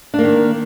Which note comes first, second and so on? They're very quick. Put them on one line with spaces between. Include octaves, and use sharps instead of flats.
D4 A#3 D#3